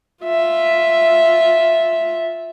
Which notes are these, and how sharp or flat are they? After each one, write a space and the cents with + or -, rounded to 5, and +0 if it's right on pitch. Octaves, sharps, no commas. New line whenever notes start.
F4 +0 E5 +0